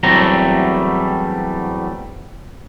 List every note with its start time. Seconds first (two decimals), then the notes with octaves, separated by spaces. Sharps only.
0.03 E2 F#3 G3 A3 C4 A#5